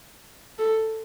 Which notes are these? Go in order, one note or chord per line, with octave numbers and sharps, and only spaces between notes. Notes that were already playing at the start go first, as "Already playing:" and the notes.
A4